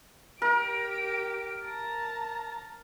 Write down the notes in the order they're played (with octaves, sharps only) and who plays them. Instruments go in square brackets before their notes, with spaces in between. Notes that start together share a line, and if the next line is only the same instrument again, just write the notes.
[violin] G4 D7 [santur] A#4
[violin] A5 A#5